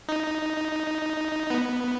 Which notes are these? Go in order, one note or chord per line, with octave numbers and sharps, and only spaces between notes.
D#4
B3